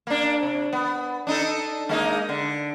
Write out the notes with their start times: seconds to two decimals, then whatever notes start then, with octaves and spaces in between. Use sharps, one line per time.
0.07 A#3 D4
0.43 C3
0.73 B3
1.27 D4 D#4 A4
1.89 G#3 A#3 D#4
2.29 D3